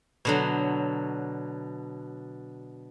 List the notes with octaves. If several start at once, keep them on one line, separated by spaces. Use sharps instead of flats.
B2 D3 F#3